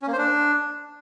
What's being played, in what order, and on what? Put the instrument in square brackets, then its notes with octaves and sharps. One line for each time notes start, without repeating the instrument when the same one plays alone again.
[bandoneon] C#4
A#3
C5
D4